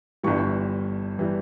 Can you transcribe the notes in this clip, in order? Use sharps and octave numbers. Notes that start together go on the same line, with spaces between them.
G1 G2 E3 G3 C#6
E3 G3